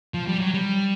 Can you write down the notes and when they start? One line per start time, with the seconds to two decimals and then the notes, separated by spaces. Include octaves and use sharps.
0.14 F3
0.27 G3
0.41 F#3
0.54 G3